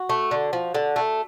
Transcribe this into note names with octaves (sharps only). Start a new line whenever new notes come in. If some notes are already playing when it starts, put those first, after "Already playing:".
Already playing: F#4
A3
D3
F3
D3
A3